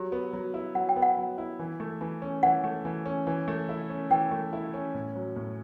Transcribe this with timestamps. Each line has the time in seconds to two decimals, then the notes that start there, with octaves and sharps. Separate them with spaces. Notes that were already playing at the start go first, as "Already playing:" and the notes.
Already playing: F#3 G4
0.12 B3
0.33 F#3
0.54 E4
0.75 F#3 F#5
0.89 G5
0.96 B3
1.02 F#5
1.17 F#3
1.38 E4
1.59 E3
1.80 A3
2.01 E3
2.22 C#4
2.43 E3 F#5
2.64 A3
2.85 E3
3.06 C#4
3.27 E3
3.48 A3
3.69 E4
3.90 C#4
4.10 E3 G5
4.31 A3
4.53 E4
4.74 C#4
4.94 A2
5.15 F#3
5.36 A2